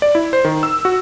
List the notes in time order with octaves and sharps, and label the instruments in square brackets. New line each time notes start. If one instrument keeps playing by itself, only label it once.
[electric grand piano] D5
E4
C5
D#3
E6
F#4